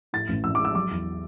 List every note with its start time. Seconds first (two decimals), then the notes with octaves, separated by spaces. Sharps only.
0.13 A2 A6
0.29 A1
0.44 A1 E6
0.55 D6
0.59 G#3
0.65 E6
0.75 F#3 D6
0.91 E2